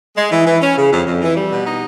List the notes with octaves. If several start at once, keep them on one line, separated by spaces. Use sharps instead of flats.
G#3
E3
E3
C#4
C#3
F2
F2
E3
G3
B2
D#4